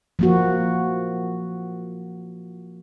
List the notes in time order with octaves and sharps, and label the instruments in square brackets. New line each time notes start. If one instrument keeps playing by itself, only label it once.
[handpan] F3 A#3 F#4